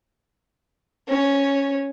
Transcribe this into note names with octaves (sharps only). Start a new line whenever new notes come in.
C#4